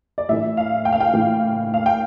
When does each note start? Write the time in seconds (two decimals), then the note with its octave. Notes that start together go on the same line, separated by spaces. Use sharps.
0.18 D5
0.29 A2 E3 E5
0.57 F5
0.85 G5
0.93 F5
1.00 G5
1.13 A2 E3
1.74 F5
1.86 G5